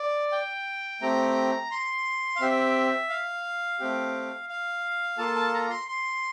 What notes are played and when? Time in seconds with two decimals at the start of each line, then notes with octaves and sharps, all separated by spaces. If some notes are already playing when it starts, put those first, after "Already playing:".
Already playing: D5
0.32 G5
1.02 A3 C4 G4 A#5
1.71 C6
2.36 F5
2.41 C4 G4 E5
3.09 F5
3.80 A3 C4 G4
4.49 F5
5.18 A#3 F4 A4 A5
5.36 A5
5.53 A#5
5.70 C6
5.88 C6